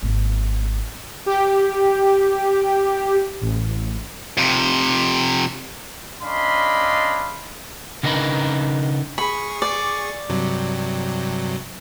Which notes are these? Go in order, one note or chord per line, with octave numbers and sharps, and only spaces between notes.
G#1 A#3
G4
A1
F2 C3
C#4 D4 D#5 F5 B5 C6
C#3 B3 D4 D#4 A#4 B4
G#4 B5 C#6
D5
G2 C3 F#3